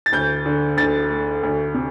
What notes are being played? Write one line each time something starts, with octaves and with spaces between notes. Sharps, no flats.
A6
D2 G6
D3
D2 A6
A3
D2
C3